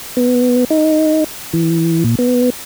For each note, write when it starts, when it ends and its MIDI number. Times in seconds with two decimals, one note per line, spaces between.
0.17 0.65 59
0.70 1.24 63
1.53 2.04 52
2.04 2.15 46
2.19 2.50 59